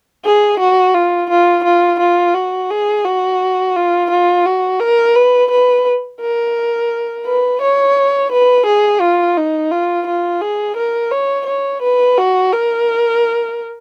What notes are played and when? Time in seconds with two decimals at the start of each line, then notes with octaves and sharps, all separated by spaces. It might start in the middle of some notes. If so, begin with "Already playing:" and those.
0.25 G#4
0.59 F#4
0.94 F4
1.30 F4
1.64 F4
2.00 F4
2.35 F#4
2.71 G#4
3.05 F#4
3.76 F4
4.10 F4
4.46 F#4
4.80 A#4
5.15 B4
5.51 B4
6.20 A#4
7.25 B4
7.61 C#5
8.32 B4
8.66 G#4
9.01 F4
9.37 D#4
9.71 F4
10.07 F4
10.41 G#4
10.76 A#4
11.11 C#5
11.46 C#5
11.82 B4
12.17 F#4
12.52 A#4